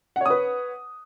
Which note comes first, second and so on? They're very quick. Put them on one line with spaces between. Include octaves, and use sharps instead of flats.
F#5 C#5 D#6 B4